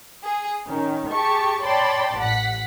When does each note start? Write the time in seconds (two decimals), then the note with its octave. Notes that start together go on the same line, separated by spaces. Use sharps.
0.22 G#4
0.67 D#3 C#4
1.10 G4 G#4 A5 C#6
1.63 C#5 D5 G5 A5 B5 C6
2.19 A1 F#5 B6